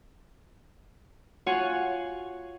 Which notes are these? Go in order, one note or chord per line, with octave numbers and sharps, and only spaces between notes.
F4 F#4 C#5 F5 F#5 G#5